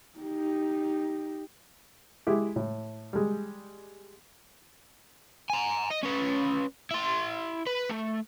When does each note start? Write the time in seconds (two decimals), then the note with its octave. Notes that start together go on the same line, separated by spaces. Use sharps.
0.19 D#4 G4
2.27 G#3 E4 G4
2.56 A2
3.13 G3 G#3
5.50 G#5 A#5
5.91 D#5
6.03 C#4 B4
6.91 E4 C6
7.67 B4
7.89 A3